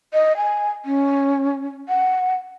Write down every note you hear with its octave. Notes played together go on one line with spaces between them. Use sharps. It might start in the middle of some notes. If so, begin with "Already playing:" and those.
D#5
G#5
C#4
F#5